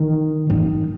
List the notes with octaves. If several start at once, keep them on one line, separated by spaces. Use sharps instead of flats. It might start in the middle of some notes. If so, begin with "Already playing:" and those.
Already playing: D#3
D#3